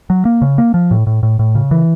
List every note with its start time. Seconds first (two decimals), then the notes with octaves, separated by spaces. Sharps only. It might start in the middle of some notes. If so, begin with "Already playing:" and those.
0.10 F#3
0.25 A#3
0.42 C#3
0.58 A#3
0.74 F3
0.91 A2
1.07 A2
1.23 A2
1.39 A2
1.55 C#3
1.71 E3